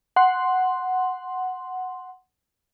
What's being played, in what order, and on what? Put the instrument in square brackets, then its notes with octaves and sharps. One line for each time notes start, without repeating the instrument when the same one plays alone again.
[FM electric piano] F#5 C6